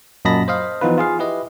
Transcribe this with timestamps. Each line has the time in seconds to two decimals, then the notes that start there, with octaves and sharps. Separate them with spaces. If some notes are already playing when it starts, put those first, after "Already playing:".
0.25 F#2 A#2 D#5 A5 B5 A#6
0.48 C5 D#5 F5
0.81 E3 F3 B3 D#4 F4 B4
0.98 F4 G#4 F5
1.19 E4 G4 B4 D#5